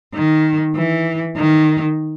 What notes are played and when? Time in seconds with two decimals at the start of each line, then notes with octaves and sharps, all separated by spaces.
0.14 D#3
0.76 E3
1.37 D#3